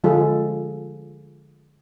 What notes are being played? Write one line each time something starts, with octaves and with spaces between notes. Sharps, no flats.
D3 F3 G#3 F4 G#4 A4